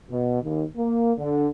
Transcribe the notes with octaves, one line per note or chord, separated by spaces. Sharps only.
B2
D#2
A#3
D3